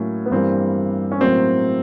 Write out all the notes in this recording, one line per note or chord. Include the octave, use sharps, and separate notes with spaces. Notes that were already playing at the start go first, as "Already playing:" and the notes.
Already playing: A2 F#3 A#3 C#4
B3
G2 E3 G3 A#3 C4
C#4
A2 F#3 A#3 C4